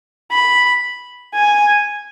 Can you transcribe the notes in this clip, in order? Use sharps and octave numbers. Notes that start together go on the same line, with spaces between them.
B5
G#5